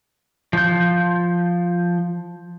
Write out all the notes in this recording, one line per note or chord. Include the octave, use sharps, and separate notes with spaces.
F3 G6